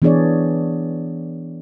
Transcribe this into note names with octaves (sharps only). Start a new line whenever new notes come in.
E3 B3 D4 G#4 C#5 D5